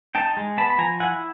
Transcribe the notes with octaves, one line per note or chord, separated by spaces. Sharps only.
D#4 G5 A5
G#3
B3 A5 B5
B5
F3 G#5 A#5
E4 F#5 G#5